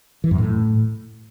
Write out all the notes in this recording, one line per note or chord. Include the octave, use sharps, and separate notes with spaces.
E3
F#2
A2